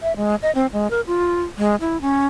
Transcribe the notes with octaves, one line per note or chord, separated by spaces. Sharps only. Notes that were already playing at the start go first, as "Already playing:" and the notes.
E5
G#3
D#5
C4
G#3
A#4
F4
G#3
E4
C#4